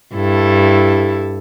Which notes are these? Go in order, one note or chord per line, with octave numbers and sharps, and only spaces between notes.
G2 E4 A4